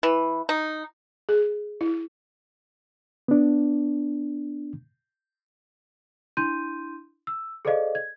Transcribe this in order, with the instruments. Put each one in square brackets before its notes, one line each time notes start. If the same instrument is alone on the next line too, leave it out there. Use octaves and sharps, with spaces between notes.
[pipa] E3
D#4
[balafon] G#4
E4
[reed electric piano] B3 D4
[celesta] D4 E4 C6 G6 D#7
E6
G#4 A4 C5 D5 D#5 F5
G#6